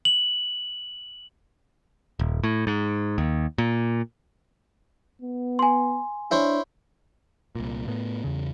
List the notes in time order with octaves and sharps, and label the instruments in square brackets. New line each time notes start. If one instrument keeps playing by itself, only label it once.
[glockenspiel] F#7
[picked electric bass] D#1
A2
G#2
D#2
A#2
[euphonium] B3
[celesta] G#5 C6
[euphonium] D4 [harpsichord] E4 C5 C#5
[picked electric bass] C2 A#2
A2 B3
E2 C#3